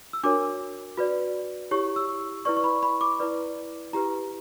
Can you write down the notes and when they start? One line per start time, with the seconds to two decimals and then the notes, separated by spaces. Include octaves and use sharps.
0.13 E6
0.23 D4 F#4 A#4 C#5 D6
0.97 F#4 B4 D5
1.71 E4 G4 C#5 C#6
1.96 E6
2.45 E4 B4 D5 C#6
2.57 C#6
2.64 B5
2.83 B5
3.01 D6
3.20 E4 B4 D5
3.93 E4 G4 B4 A#5